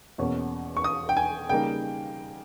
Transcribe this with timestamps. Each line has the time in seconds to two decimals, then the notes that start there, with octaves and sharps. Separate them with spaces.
0.18 E2 B2 A#3 C#4
0.77 C#6
0.84 D#6
1.09 G5
1.17 G#5
1.49 C#3 G3 A#3 D#4 G5